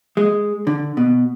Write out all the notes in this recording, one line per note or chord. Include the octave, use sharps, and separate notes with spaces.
G#3
D3
B2